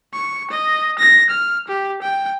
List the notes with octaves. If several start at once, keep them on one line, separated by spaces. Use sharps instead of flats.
C#6
D#5
A#6
F6
G4
G5